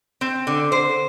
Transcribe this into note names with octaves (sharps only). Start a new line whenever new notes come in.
C4
D3
C5